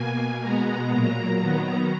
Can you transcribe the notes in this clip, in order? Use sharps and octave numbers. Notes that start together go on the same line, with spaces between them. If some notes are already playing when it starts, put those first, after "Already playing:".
Already playing: B2 A#3 G#5
B2 G#3 B3 A#5
A#2 F#3 A#3 A#5
D#3 F#3 B3